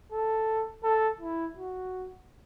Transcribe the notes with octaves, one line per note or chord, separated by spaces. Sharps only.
A4
A4
E4
F#4